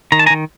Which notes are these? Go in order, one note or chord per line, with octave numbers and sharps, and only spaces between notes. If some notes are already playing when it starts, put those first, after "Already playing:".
D#3 A#5
A5
G#5 A#5
D#3